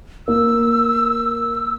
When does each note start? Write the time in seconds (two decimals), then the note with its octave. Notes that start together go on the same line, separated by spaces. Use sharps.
0.28 A#3 E6